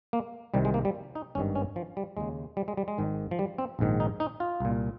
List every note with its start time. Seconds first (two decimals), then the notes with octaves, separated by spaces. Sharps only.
0.13 A#3
0.54 C2 C3 D#3 G3
0.65 G#3
0.74 A#3
0.85 G3
1.15 D#4
1.35 G#1 G2 D#3 C#4
1.55 C#4
1.76 F3
1.97 G3
2.17 D#2 C#3 G#3
2.57 G3
2.68 G#3
2.77 G3
2.88 G#3
2.98 G#1 G#2 D#3
3.31 F3
3.39 G3
3.58 C4
3.79 A#1 G#2 D#3
4.00 D#4
4.20 D#4
4.40 F4
4.60 C2 A#2